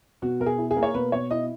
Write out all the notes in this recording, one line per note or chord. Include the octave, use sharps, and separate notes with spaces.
B2 F#4
B2 A#4
G#4
E4
G#4
A#3
C#5
B2 B4
B2 C#5
E4 D#5